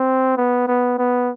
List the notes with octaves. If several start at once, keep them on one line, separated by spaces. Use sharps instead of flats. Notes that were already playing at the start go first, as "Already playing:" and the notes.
Already playing: C4
B3
B3
B3